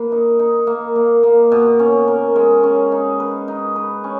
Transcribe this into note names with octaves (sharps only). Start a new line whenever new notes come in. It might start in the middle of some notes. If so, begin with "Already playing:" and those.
Already playing: A#3 B4
D#4
D#4
A#3
A#3
A#3
B2
C#4
A#4
G#3
C#4
D#4
B4
D#4
B4
C#4